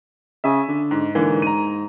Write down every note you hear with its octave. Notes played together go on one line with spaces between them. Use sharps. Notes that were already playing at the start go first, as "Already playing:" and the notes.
C#3 E5 G#5
D3
G#2
G#2 D3 E3 A#3
A#5 D#7